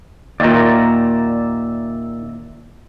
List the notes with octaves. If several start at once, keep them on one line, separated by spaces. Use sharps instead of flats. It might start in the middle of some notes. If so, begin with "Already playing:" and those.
D#2 A#2 D5 E5 A#5